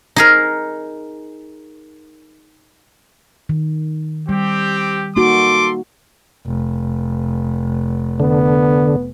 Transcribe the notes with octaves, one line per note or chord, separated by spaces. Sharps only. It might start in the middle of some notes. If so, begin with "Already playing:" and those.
D#4 G#4 A#4
D#3
G3 C4 G4
A#3 D#4 F#4 A4 C6 D6
F1
D3 B3